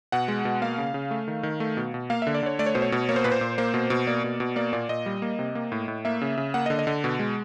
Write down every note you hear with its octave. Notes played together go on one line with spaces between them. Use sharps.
B2 F#5
G#3
B2
A#3 F5
C#3
C#3
A3
D#3
D#3
A3
B2
B2
A#3 F5
D3 E5
D5
D3 C#5
A3 D5
C#5
B2 C5
C#5
B2
A#3 C#5
C5
A#2 B4
C5
A#2
A#3 C5
B2
B2
A#3 D5
B2
B2
A#3 D5
A#2 D5
A#2 D#5
G3
A#3
C3
A#3
A2
A2
A#3 E5
C#3
C#3
A#3 F#5
D#5
D3
D#5
D3
B2
G#3